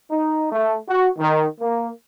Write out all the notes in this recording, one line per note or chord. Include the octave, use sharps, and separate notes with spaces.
D#4
A3
F#4
D#3
A#3